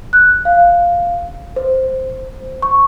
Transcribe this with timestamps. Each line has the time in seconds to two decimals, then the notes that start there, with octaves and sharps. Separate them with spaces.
0.13 F#6
0.45 F5
1.56 C5
2.62 C#6